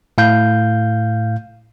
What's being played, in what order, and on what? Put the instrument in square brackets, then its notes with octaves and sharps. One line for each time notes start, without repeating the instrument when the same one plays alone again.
[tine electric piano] A2 F5 G6